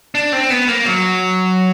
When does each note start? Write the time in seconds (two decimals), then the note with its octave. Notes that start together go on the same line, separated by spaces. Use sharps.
0.15 D4
0.33 C4
0.50 B3
0.68 A#3
0.86 F#3